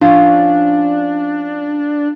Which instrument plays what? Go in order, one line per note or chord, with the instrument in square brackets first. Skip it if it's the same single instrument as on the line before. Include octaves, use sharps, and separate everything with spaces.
[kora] F3 C#4 [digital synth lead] D4